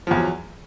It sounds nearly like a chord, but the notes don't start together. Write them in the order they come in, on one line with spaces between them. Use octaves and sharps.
F3 E2 F#3